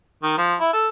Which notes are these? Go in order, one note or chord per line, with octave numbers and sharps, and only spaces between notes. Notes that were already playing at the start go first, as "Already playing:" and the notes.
D#3
F3
E4
A4